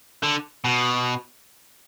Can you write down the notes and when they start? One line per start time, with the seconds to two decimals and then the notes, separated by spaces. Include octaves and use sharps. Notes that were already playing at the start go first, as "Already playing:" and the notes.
0.23 D3
0.64 B2